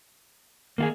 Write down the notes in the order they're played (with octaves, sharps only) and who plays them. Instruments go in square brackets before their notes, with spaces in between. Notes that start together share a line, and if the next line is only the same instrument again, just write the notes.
[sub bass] D#3 [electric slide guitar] A#3 F4 G#4